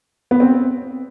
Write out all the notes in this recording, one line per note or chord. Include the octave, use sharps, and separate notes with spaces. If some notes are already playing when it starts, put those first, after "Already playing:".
B3
C4